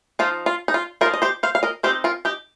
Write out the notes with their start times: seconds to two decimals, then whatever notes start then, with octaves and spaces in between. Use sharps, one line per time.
0.19 F3 D#4 F4
0.46 F4
0.68 D#4
0.74 F4
1.01 D#4 F4 A#4
1.06 F3
1.14 D#5
1.22 G4 C5
1.43 C5 F5
1.55 F5
1.63 A#4 D#5
1.83 D#3 C4 D#4 G4 C5
2.04 F4 A#4
2.25 D#4 G4